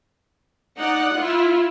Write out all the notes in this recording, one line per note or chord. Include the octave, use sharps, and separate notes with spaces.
D#4 D5 F#5
E4 F4